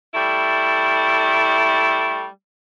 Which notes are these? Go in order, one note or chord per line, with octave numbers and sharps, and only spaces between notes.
G3 A3 E4